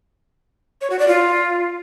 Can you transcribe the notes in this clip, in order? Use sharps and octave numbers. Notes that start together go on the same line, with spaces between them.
C#5
F#4
D5
F4